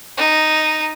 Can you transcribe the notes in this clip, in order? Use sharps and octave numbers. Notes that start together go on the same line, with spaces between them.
D#4